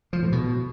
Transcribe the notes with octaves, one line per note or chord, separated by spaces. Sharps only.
F3
A2
B2